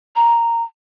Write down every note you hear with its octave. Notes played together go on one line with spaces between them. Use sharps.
A#5